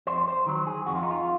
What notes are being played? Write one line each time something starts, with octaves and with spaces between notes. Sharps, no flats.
F2 C5
C5
D#3 F#3
G#4
F2 F#4
F4
D#4
F4